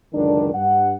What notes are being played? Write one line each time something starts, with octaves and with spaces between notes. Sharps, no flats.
C#2 F#2 D3 D#3 D4
G2 F#5